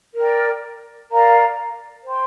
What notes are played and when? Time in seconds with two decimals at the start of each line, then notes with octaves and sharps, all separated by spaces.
0.15 A#4 D5 G5
1.10 A#4 D5 F5 A#5
2.05 C5 G5 C6